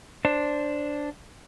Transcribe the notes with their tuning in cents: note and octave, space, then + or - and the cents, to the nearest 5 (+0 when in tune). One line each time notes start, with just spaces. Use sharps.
D4 +0 C5 +5